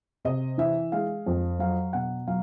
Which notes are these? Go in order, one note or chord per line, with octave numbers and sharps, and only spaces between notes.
C3 D#5
E3 E5
G#3 F5
F2
F#3 F5
B2 F#5
F#3 F5